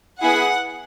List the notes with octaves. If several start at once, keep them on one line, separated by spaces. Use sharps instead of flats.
B3 E4 G#4 F#5